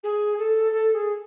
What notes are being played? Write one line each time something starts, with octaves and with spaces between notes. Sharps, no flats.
G#4
A4
A4
G#4